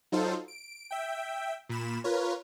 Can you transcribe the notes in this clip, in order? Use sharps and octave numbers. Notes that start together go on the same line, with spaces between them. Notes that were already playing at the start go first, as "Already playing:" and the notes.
F#3 D#4 F4 A4 C5
D7
E5 G5
A#2 B5 E7
F4 A#4 B4 C#5